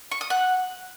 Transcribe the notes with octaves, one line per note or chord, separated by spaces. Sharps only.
C#6
D#6
F#5